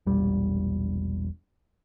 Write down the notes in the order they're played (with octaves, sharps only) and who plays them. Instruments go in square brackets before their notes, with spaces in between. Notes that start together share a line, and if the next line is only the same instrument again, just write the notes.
[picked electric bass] E1 A#1 G3